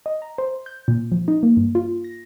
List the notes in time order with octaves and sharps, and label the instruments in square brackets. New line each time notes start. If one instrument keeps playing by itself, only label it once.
[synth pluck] D#5
A#5
C5
G6
A#2
F3
D#4
A#3
G2
F4
A#6